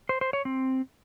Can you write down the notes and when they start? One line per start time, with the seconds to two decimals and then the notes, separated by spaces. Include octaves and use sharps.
0.09 C5
0.21 C5
0.33 C#5
0.45 C4